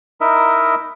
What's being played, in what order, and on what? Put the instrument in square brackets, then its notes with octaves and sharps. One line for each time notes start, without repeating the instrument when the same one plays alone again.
[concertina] D#4 E4 A#4 D#5 E5